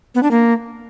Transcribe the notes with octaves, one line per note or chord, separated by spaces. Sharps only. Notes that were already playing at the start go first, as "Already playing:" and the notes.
B3
D4
A#3